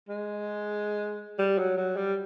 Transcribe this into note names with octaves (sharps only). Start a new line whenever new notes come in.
G#3
G3
F#3
F#3
G3